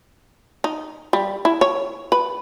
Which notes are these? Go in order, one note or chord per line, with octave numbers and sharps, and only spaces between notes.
D#4
G3
E4
C#5
B4